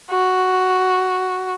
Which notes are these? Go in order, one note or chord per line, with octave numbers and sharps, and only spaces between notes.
F#4